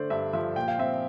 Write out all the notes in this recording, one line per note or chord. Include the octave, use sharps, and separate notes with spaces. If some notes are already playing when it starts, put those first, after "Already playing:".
Already playing: D3 A3 C5 D5
G2 E5
F3 E5
A#2 G5
F5
C4 E5